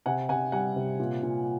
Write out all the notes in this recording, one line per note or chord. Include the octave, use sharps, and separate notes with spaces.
C3 F#5 G#5
C3 F#5 G#5
G3 F#5 G#5
C3
A#2
A#2